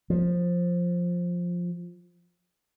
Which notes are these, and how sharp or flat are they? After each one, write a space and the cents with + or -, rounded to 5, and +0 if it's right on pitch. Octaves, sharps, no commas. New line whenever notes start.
F3 +10